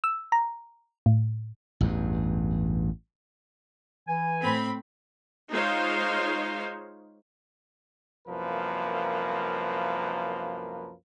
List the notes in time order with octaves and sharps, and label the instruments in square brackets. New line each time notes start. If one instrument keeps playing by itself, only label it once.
[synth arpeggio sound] E6
A#5
A2
[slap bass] A1 E2 G2
[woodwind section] E3 G#5
[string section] A2 C4 B5
[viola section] G#3 D#4 F4 C5 C#5 F5
[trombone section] C2 F#2 F3 A#3 A#4 B4